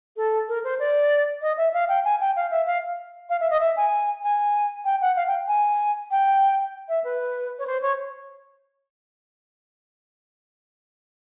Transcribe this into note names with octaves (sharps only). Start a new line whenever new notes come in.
A4
A#4
C5
D5
D#5
E5
F5
G5
G#5
G5
F5
E5
F5
F5
E5
D#5
E5
G#5
G#5
G5
F#5
F5
G5
G#5
G5
E5
B4
C#5
C5
C#5